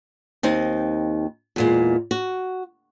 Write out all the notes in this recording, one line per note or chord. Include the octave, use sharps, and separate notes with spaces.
D#2 C4 D#4
E2 A#2 G#3
F#4